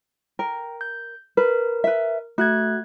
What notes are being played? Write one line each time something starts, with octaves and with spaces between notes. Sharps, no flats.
A#4 G5
G6
A#4 B4
B4 E5
A3 F#4 F#6 G#6